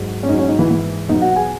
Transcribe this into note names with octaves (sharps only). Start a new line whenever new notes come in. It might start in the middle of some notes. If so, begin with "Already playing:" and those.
Already playing: G#2 F#3
C#4
G#2 F#3 D#4
C#4
D#4
E3 E4
G#2 E3
E2 B2 F#3 D#4 D#5
F#4 F#5
G#4 G#5